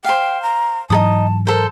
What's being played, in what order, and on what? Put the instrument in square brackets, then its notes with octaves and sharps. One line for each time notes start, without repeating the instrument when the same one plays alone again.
[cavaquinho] C5 F5 [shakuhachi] G5
[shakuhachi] A#5
[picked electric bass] G#2 E3 F#3 [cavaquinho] D#4 A4 D#6 [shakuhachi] A5
[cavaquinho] A4 C5 [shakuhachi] A#4